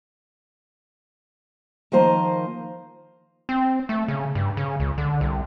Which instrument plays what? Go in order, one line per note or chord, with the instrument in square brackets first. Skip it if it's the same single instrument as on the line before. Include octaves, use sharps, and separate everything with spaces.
[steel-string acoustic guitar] D#3 F3 A#3 C5 D#5 A#5
[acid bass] C4
A3
C#3
G2
C#3
C#2
D3
C2